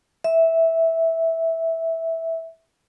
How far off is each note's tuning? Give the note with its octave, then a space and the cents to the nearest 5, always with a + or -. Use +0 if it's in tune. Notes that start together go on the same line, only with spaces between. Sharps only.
E5 -10